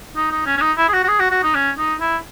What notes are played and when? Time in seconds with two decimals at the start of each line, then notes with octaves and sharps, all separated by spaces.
0.16 D#4
0.31 D#4
0.46 C#4
0.57 C#4
0.61 D#4
0.77 E4
0.88 G#4
0.93 F#4
1.04 F#4
1.08 G#4
1.19 F#4
1.31 F#4
1.43 D#4
1.55 C#4
1.78 D#4
2.01 E4